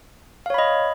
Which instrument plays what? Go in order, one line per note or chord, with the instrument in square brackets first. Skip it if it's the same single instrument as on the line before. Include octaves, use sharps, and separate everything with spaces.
[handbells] F5
C#5
B5
D#5